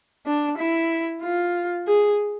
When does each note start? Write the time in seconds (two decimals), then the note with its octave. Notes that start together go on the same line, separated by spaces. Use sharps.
0.26 D4
0.58 E4
1.22 F4
1.87 G#4